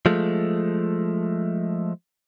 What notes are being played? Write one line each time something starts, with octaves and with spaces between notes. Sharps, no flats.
F3 G#3 A3